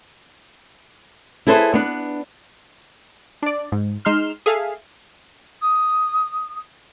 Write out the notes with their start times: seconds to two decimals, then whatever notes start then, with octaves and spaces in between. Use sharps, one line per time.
1.47 E4 G#4 A4 B4 C5
1.74 B3 D4
3.43 D4 D5
3.72 G#2
4.04 G#3 D#4 C6 F6 E7
4.46 G#4 A4 E5 F5
5.62 D#6